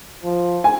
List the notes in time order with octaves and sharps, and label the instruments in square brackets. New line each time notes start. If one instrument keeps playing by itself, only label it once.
[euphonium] F3
[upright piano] G#5